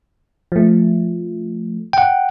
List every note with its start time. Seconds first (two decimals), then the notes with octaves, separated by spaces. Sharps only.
0.52 F3 A3
1.93 F#5 G5